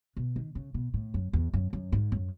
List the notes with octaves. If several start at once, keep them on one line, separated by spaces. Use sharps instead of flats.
B2
D#3
C#3
B2
A2
F#2
E2
F#2
F#2
G#2
F#2